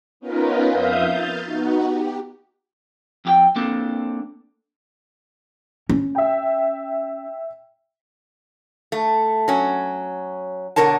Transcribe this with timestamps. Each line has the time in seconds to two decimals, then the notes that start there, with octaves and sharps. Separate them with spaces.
0.20 B3 C#4 D#4 F4 A#4 B4
0.68 F2 E5 F5 D#6 G6
1.07 F6 G6 A6
1.44 B3 D#4 F#4
1.85 G4
3.25 F2 G4 G5
3.56 A#3 C4 D4 A4
5.89 C#4
6.15 E5 G5
8.92 A3
9.48 F#3 C#4
10.76 B2 D3 A#4 C#5 A5